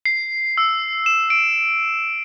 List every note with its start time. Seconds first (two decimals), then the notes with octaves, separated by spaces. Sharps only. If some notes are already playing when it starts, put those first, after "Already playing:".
0.06 C7
0.58 E6
1.06 E7
1.30 D7